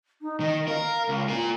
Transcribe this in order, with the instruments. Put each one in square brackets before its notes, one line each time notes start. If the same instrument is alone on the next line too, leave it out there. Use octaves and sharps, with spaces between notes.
[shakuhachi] D#4
[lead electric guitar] D#3 [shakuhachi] D#5
[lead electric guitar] A#4 [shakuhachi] F5
[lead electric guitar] C#2
F4 A#4